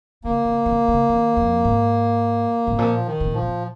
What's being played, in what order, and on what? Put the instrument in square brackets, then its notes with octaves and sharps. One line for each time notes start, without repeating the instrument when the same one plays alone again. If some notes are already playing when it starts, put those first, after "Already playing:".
[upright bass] C#3 [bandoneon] A#3
[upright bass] C#3
C#3
C#3
D#3
F2
G#2
G#2
[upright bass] A#2 [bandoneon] F3
[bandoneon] D#3
[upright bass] A#2
[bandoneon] F3
[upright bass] A#2